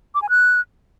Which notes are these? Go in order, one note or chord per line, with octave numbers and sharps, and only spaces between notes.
D6
G#5
F#6